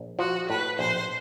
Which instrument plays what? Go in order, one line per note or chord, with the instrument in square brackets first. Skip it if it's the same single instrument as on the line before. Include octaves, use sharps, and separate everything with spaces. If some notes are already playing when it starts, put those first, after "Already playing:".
Already playing: [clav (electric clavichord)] A#1
[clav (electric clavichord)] F3 [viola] F#4
[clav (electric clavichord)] A2 [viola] B4
[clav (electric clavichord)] A#1 [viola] C5